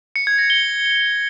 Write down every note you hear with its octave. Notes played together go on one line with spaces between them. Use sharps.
C#7
G#6
A#6
G7